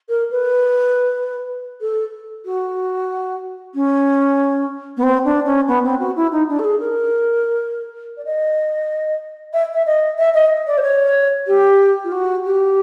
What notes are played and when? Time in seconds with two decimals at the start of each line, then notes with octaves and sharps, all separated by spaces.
0.09 A#4
0.31 B4
1.81 A4
2.45 F#4
3.74 C#4
4.97 B3
5.03 C4
5.25 D4
5.45 C#4
5.67 B3
5.83 C4
5.99 F#4
6.16 E4
6.32 D#4
6.48 D4
6.59 A4
6.64 G#4
6.79 A#4
8.17 D5
8.25 D#5
9.53 E5
9.73 E5
9.86 D#5
10.18 E5
10.34 D#5
10.67 D5
10.77 C5
10.82 C#5
11.47 G4
12.04 F4
12.12 F#4
12.44 G4